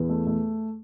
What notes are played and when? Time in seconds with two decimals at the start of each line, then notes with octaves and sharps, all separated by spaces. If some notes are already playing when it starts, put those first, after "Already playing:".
Already playing: E2 B3
0.09 A3
0.26 A3